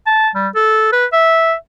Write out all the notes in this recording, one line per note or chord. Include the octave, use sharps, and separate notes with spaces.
A5
G3
A4
B4
E5